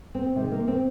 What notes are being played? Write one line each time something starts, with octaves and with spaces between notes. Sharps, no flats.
C4
C3 D#3 G#3
A#3
C4